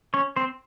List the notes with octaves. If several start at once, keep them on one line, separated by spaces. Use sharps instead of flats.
C#4 C#5
C4 C5